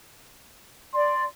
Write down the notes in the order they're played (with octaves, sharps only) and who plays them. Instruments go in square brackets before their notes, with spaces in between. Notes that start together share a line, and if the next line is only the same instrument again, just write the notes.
[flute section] D5 [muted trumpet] C6